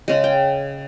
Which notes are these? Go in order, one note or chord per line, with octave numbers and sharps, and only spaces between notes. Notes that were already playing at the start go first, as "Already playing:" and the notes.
C#3 G#3
G5